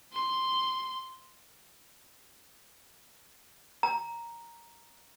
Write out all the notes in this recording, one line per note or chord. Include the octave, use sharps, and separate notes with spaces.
C6
A#5